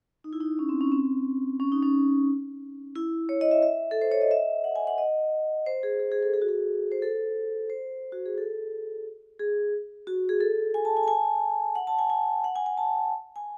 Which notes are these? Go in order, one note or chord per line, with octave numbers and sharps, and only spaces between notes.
D#4
E4
D#4
C#4
C4
C#4
C4
C#4
D#4
C#4
E4
C#5
D#5
E5
E5
A4
C5
C#5
D#5
E5
F#5
G#5
F#5
D#5
C5
G#4
G#4
G#4
A4
G#4
F#4
G#4
C5
A4
C5
F#4
G#4
A4
G#4
F#4
G#4
A4
G#5
A5
G#5
A5
G#5
F#5
A5
G#5
G#5
F#5
G#5
G#5
A5
G#5